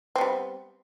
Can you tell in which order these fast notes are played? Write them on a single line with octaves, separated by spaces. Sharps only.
C4 B3 G3